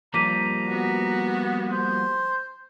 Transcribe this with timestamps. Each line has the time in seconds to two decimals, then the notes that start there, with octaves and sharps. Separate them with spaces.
0.14 F3 G3 A#3 A#5 D6 B6 D#7
0.68 B3 F#4
1.72 C5